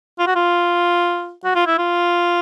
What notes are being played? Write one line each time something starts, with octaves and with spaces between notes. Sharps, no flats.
F4
F#4
F4
F#4
F4
E4
F4